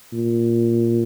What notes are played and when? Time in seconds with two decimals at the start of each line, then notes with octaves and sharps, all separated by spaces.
0.12 A#2